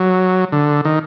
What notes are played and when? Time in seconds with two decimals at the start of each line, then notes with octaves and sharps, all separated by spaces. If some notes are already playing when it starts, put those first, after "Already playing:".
Already playing: F#3
0.52 D3
0.85 D#3